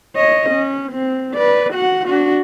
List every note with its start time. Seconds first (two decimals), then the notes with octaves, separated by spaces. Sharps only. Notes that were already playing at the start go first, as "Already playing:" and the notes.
0.16 C#5 D#5
0.50 C#4
0.92 C4
1.34 B4 D5
1.74 F#4 F#5
2.07 D4 F#4